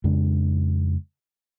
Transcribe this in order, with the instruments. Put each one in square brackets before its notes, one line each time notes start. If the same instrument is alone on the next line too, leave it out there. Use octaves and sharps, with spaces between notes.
[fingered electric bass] F2 C#3 G#3 D4